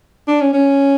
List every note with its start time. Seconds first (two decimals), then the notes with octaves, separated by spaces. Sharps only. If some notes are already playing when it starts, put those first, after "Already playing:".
0.28 D4
0.41 C#4
0.53 C#4